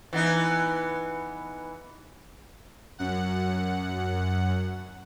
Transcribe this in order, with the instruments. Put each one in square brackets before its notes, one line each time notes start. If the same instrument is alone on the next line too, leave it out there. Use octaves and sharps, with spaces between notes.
[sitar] E3 B3 D#4
[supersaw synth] F#2 F#5